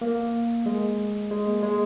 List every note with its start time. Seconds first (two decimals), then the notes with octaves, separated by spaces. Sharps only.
0.01 A#3
0.66 G#3
1.31 G#3
1.46 A#3
1.63 G#3